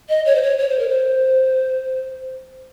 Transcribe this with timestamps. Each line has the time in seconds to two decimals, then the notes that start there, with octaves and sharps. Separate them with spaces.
0.09 D#5
0.26 C#5
0.35 C5
0.42 C#5
0.59 C#5
0.69 C5
0.79 A#4
0.89 C5